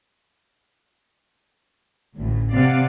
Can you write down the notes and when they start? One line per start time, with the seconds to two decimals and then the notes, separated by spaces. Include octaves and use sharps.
2.17 A1 D2 A2
2.53 C3 D5 F5 F#5